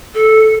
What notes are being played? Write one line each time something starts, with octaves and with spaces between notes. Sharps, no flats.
A4